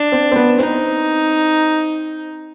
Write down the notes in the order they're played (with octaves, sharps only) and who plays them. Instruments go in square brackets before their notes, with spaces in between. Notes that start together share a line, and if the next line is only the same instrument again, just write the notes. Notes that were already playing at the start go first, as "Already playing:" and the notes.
Already playing: [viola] D4
[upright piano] C4
C4
B3
[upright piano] C4 [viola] D#4